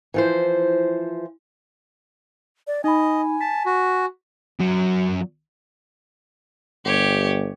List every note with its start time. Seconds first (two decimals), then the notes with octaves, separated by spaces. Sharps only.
0.14 E3 F3 C5
2.67 D5
2.84 D#4 D#5 G#5 B5
3.41 A5 B6
3.66 F#4
4.60 F#2 F#3
6.85 G1 G4 C#5